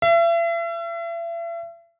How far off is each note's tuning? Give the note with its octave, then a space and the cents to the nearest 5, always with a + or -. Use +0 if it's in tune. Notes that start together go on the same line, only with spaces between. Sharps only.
E5 +40